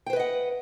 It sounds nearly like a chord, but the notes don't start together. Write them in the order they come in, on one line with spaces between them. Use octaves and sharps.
G5 C5 B4 D#5 F#5